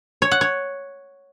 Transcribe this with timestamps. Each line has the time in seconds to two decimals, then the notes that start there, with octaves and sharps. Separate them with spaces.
0.22 C#5
0.31 F#5
0.41 C#5